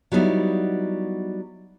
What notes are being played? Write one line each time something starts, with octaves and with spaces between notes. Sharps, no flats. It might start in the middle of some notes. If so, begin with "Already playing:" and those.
F#3 G3 B3 D#4 E4